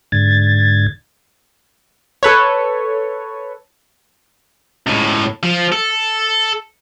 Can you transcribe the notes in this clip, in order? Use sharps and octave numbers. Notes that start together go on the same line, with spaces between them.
G#2 D3 G#6 A6
A4 B4 C#5
C#2 A2
F3
A4